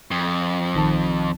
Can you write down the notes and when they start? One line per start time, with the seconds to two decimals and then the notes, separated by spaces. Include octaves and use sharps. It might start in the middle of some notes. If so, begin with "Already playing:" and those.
0.11 F2
0.74 A#1 D#3 A5